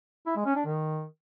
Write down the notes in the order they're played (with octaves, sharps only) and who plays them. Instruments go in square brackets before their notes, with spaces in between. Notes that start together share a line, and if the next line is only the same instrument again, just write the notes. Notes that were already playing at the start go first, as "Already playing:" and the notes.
[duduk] E4
G#3
C#4
D4
D#3